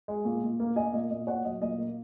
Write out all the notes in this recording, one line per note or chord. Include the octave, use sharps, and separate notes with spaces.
G#3
A#2
A#2
A#3
A#3 D#5 G#5
A#2 D#5
A#2 D#5
A#2 C#5 F#5
F#3 D#5
A#2 D#5
A#3